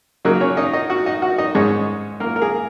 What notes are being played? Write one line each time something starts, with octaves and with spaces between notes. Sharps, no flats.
C#3 F#3 A#3 D#4 A#4
C#4 C#5
D#4 D#5
D#4 D#5
F#4 F#5
D#4 D#5
F#4 F#5
D#4 D#5
G#2 G#3 C#4 D#4 C#5
A#3 A#4
A#4
G#4